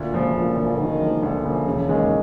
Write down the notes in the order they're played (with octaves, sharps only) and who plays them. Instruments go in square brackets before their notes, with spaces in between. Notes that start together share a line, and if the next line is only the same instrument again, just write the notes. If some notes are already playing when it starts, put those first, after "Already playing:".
Already playing: [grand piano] D2 [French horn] A#2
[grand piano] C#3 F3 A#3
[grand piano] D2 [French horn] A#2
[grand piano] C#3 F3 A#3
[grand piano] D2 [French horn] D#3
[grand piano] C#3 F3 A#3
[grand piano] D2 [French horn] D3
[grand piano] C#3 F3 A#3
[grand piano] E1 [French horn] C#3
[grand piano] D#2 D#3 G#3